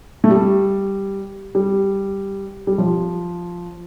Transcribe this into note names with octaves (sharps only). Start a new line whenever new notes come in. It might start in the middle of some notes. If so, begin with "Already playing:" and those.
A3
G3
G3
G3
F3